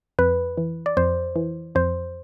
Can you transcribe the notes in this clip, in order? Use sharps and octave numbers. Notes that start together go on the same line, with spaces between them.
F2 B4
E3
D5
F2 C5
E3
F2 C5